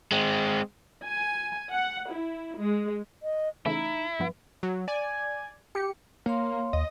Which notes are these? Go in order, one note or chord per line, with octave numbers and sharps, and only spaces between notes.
G#3 C4
G#5
F#5
E4
G#3
D#5
C#3 E3 A3 D#4 E4
G2 F3 B3
F#3
D5 G#5
G4 C#7
A#3 C#5 F5 C6
D#2 D#5